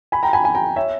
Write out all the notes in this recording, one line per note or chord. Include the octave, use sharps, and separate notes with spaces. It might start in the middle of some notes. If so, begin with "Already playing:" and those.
G#5 B5
G5 A#5
G#5 B5
G#5 B5
G5 A#5
C#5 E5